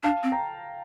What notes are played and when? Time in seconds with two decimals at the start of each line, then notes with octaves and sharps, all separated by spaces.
0.03 D4 F5 A5
0.23 C4
0.32 G5 A#5